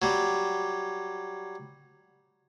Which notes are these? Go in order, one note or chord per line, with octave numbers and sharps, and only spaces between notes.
F#3 G3